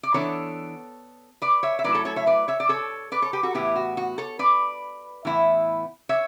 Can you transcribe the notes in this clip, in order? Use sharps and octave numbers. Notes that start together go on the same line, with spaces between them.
D5
E3 B3 D4 A4 C#5
B4 D5
C#5 E5
E5
F#3 A3 E4 B4 D5
A4 C#5
A4 C#5
C#5 E5
B4 D5
C#5 E5
D5
A4 C#5
B4 D5
A4 C#5
G4 B4
F#4 A4
A2 E3 B3 E4 G4
F#4
F#4
A4 C#5
B4 D5
A2 E3 B3 E4
C#5 E5